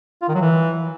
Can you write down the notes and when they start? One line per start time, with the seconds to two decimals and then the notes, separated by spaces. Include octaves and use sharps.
0.22 F4
0.28 D#3
0.35 F#3
0.41 E3